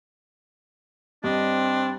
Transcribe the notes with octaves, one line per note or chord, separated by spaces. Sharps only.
G2 C4 D4 D#5